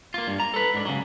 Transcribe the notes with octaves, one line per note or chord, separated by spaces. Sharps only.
A#3 F4
G2
A#5
A4 B4
G#2 D4
C#3 F#3